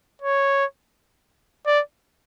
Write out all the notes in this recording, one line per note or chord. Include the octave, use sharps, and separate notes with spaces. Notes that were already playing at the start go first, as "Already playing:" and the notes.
C#5
D5